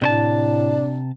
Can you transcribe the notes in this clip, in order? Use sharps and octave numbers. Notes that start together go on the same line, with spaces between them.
A2 C3 D4 C5 A5